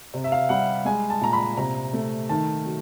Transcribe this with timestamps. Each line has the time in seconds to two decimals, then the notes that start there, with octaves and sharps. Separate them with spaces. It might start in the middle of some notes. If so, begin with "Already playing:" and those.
0.14 C3
0.24 E5
0.32 F5
0.49 G3 F#5
0.85 G#3 G#5
1.10 A5
1.21 A#2 A#5
1.33 B5
1.57 C3 A#5
1.93 A3
2.29 D#3 A5
2.65 F#3